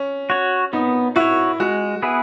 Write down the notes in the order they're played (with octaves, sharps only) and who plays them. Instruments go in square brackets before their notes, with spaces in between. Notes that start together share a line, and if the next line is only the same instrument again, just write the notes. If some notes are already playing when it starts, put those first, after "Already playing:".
Already playing: [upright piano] C#4
[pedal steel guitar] F#4 C#5
[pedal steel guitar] B3 [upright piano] D#4
[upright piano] E4 [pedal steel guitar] F#4 C#5
[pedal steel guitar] G#3 [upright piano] F#4
[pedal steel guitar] B3 E4 G#4 B4